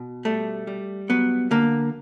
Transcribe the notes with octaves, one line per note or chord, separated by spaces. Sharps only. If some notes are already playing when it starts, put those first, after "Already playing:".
Already playing: B2
G3 A3
G3
F#3 B3
D3 A#3